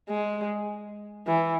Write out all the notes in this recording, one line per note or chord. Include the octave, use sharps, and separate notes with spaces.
G#3
E3